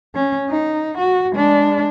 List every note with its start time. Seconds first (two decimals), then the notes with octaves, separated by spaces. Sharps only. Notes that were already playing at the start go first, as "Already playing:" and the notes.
0.15 C#4
0.50 D#4
0.98 F#4
1.33 G#3 D4